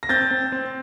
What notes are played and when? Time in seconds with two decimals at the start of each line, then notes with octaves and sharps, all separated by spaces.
0.03 A#6
0.09 C4 G6 A6
0.31 C4
0.52 C4